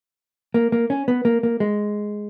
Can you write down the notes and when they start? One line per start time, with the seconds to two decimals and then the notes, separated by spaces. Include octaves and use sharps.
0.54 A#3
0.72 A#3
0.90 C#4
1.08 B3
1.25 A#3
1.43 A#3
1.60 G#3